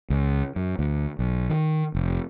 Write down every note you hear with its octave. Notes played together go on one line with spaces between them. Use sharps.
C#2
F#2
D2
B1
D#3
F1